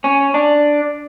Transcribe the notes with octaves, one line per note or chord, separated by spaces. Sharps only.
C#4
D4